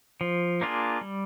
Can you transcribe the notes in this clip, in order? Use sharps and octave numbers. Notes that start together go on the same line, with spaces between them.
F3
A#3 D4 F4 G#4
G3